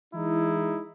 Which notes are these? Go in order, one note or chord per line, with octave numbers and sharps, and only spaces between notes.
E3 G#3 D#4 E4